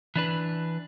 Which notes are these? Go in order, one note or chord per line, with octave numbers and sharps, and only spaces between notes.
E3 D4 B4